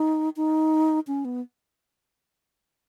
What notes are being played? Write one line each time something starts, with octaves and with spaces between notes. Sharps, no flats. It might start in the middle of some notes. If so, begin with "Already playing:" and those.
Already playing: D#4
D#4
C#4
B3